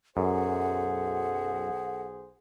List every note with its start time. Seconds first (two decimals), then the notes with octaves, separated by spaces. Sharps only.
0.17 B1 F#2 G#4 A4 C5 F#5